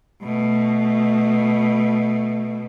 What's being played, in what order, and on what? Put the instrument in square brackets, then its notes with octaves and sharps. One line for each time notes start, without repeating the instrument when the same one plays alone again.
[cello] B2 A3